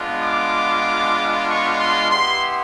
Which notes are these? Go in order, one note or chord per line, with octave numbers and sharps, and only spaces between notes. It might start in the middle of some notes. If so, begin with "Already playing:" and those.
Already playing: G#3 B3 D4 F4
D6
C#6
C6
B3 E4 G4 C6